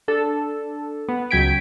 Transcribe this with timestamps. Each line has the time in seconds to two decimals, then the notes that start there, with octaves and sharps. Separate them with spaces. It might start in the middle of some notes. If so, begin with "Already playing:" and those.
0.08 D4 A4
1.09 B3
1.31 C#2 F#3 G5 G#6 B6 D7